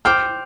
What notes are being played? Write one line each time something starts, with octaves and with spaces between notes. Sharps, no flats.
C5 G5 D6 F6